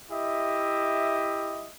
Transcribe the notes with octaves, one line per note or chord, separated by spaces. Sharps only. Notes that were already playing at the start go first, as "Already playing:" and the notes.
E4 G4 D#5 E5